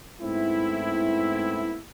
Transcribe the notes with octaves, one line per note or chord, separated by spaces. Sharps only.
G#2 A3 B3 C4 E4